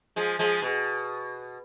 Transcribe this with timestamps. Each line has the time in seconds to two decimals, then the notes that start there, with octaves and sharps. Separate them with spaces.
0.16 F3 G#3
0.39 F3 G#3
0.62 B2